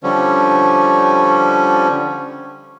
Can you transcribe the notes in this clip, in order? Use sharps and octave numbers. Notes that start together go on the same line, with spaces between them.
D3 F3 G3 C#4